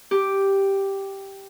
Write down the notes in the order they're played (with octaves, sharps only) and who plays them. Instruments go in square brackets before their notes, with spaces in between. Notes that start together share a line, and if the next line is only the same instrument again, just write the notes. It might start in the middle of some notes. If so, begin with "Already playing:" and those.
[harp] G4